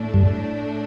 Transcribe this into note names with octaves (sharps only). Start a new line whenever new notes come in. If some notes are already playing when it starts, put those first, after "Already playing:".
Already playing: A2 A3 D4
G2